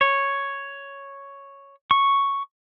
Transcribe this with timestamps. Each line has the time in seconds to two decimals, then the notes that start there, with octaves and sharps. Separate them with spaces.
0.01 C#5
1.91 C#6